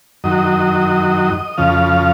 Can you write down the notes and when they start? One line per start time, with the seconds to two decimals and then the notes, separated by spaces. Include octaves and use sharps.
0.24 F#2 D#3 F#3 D#5
1.57 F2 C#3 F3 F5